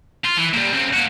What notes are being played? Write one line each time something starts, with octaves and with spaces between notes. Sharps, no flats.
F4
E3
A#2 G3
C#3 C4
A#3 F#4